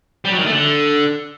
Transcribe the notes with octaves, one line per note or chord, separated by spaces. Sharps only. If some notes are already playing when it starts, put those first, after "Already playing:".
G3
F#3
D#3
A3
D3